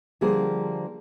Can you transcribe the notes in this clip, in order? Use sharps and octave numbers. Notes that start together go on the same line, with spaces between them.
D3 F3 G3 A#3 G#4 C5